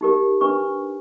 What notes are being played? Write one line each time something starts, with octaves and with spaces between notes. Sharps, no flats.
D#4 G4 A#4
D4 B4 C#6